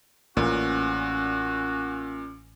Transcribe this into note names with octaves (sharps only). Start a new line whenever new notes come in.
A1 A#2 C#4 F#4